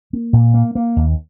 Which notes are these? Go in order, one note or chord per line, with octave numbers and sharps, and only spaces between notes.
A#3
A#2
A#3
A#3
D#2